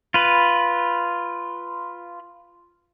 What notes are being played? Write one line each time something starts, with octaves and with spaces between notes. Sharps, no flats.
F4 B4